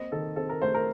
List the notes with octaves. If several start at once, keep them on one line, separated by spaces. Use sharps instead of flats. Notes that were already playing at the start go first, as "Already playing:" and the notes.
Already playing: A#3 C4 D#5
D#3 A4
C4 A4
A#4
A3 C5
A#4